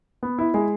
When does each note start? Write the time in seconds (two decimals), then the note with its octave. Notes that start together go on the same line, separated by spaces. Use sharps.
0.23 B3
0.39 E4
0.54 G#3